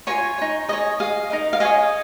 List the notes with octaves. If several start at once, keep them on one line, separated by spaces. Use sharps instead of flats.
F4 A#4 C#5 G#5 C#6
D#4 C#5
G#4 C#5 D#5
G#4 D#5 F5
D#4 A#4 D#5
F5
G#4 C#5 D#5 G#5